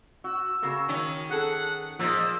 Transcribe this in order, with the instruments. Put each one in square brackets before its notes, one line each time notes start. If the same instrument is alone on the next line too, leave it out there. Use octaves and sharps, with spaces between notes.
[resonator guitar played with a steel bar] F#4 [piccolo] E6
[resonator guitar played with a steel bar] C#3 A#3 F#4
[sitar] D#3 C#4
[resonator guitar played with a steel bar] G#4 A4 [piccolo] F#5
[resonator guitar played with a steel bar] A#2 G#3 [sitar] F3 A#3 [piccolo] E6